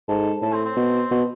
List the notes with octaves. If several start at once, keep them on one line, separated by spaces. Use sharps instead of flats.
G#2 A4
A2 A4
C4
C4
B2
B2